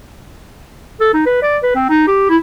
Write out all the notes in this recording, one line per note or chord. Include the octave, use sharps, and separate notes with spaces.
A4
D#4
B4
D5
B4
C4
D#4
G4
E4